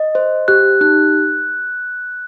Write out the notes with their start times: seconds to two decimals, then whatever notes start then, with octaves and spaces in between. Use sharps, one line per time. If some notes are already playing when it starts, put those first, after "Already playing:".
Already playing: D#5
0.15 C5
0.48 G4 F#6
0.81 D#4 F#6